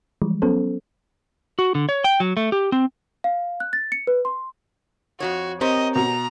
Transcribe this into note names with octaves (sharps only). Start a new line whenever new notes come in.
E3 F3 G3 G#3
F#3 B3 C#4 A4 C5
F#4
D3
C#5
G5
F#3
A3
G4
C4
F5
F#6
A6
C#7
B4
C6
F2 C#3 F#4 C#5
C4 G4 A#4 C#5 D#5
B2 A#5